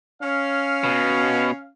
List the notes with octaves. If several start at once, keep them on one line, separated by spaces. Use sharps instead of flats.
C#4 F5
B2